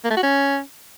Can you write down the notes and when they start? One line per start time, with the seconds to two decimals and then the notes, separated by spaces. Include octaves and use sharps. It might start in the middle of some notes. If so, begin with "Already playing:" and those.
0.04 A#3
0.11 A3
0.17 F#4
0.23 C#4